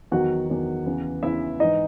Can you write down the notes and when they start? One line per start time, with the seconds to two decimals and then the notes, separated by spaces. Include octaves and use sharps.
0.12 E2 D#3 F#3 F#4 F#5
0.49 E2 D#3 F#3
0.86 E2 C#3 E3
1.23 E2 C#3 E3 E4 E5
1.60 G#2 E3 D#4 D#5